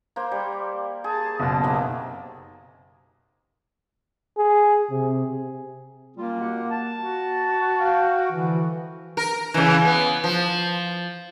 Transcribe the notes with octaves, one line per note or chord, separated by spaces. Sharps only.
A#3 C5
G3
G#4 A5
F#1 B2
C3 D#3 A#3
G#4
C3
G3 A#3 C#4 F4
B2 G4 F#5
A5
F#4
F5 G5
D3 E3 F3 G3
A#4
C#3 E3
B3
F3